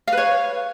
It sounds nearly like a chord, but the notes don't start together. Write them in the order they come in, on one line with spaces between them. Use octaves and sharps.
F5 B4 C#5